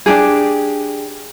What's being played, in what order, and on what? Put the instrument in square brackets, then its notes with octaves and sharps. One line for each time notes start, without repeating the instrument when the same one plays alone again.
[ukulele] D4 E4 G4 G#4